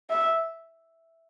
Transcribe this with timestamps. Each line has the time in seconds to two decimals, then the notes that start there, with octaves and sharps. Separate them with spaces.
0.10 E5